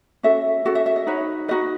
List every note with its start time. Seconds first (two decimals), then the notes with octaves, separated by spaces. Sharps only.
0.23 C#4 F#4 A4 E5
0.65 C#4 F#4 A4 F#5
0.75 E5
0.86 E5
0.96 D#5
1.07 D#4 F#4 B4 C#5
1.48 D#4 F#4 B4 D#5